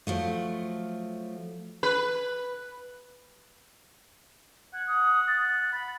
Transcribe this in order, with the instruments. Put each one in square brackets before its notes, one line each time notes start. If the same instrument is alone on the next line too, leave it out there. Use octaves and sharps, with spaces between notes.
[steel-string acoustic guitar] F3 F#3 A3
[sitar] B4
[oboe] F#5 [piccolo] G#6
[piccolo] D#6
A6
[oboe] B5